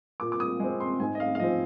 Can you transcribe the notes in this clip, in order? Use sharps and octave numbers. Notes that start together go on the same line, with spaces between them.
A#2 D6
D6
D#6
G#3 C4
C6
G#2 G#5
D#5
F5
F5
F3 C4 D#5